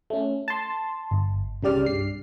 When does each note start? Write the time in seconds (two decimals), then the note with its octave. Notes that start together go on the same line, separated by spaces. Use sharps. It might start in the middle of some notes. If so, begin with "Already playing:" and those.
0.10 A3 C#4
0.48 A5 C6
1.11 G1
1.63 C2 C#3 G3 G4 D5 F6
1.86 G2 C7